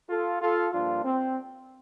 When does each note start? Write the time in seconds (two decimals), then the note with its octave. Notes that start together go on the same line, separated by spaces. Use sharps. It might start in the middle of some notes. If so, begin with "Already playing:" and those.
0.10 F4 A4
0.41 F4 A4
0.73 G2 F3 A#3 D4 F4
1.05 C4